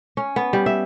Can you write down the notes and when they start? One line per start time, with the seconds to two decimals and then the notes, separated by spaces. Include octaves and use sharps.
0.17 C#4
0.36 B3
0.53 G3
0.66 E5